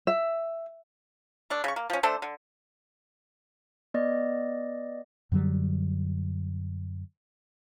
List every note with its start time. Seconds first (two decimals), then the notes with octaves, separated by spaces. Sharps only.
0.07 E5
1.50 A3 D4
1.64 C#3 C#6
1.76 A#3
1.90 F3 C#4
2.03 A3 D4 A4 C5
2.22 D3
3.94 B3 D5 D#5
5.32 F#2 D3 F#3 G3